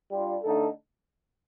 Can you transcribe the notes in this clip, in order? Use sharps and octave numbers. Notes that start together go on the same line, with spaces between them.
G3 D4 F4
D3 A3 D#4 A4